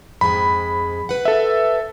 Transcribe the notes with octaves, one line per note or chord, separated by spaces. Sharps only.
F2 G#2 G#3 B5
B4 F#5
A4 E5